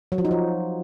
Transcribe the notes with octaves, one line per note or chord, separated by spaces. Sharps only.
F#3
F3
D#4
F3